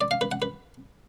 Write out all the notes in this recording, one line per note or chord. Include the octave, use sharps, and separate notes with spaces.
D5
F5
B4
F#5
B4